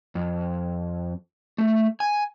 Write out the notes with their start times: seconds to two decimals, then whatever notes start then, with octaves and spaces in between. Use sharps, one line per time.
0.15 F2
1.58 A3
2.00 G#5